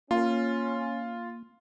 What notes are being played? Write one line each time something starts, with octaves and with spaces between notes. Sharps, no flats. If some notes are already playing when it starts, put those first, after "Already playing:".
A#3 C#4 F4